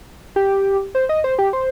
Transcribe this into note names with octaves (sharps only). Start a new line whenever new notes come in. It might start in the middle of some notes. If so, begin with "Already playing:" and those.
G4
C5
D#5
C5
G4
C5